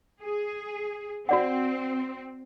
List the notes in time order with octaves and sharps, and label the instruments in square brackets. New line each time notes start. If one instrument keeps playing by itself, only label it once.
[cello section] G#4
[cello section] C4 [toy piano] F#4 D5 F#5